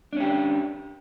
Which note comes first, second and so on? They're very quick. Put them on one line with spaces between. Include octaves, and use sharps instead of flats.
D4 C#4 G4